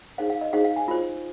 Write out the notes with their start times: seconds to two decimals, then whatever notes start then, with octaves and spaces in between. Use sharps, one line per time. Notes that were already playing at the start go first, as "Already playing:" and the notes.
0.18 D#4 G#4 C5 F5
0.30 F5
0.41 D#5
0.53 D#4 G#4 C5 F5
0.64 F5
0.76 G#5
0.88 F4 C5